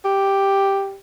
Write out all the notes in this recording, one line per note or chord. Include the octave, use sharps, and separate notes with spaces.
G4